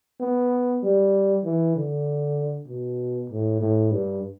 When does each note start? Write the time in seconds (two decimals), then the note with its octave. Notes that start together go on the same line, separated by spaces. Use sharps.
0.21 B3
0.83 G3
1.45 E3
1.76 D3
2.68 B2
3.30 A2
3.60 A2
3.92 G2